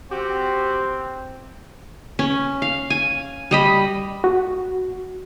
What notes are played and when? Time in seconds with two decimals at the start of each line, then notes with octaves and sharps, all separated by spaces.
0.11 C4 F#4 G4
2.19 C#4
2.62 F5
2.90 G#5
3.51 G3 D#5 B5
4.24 F#4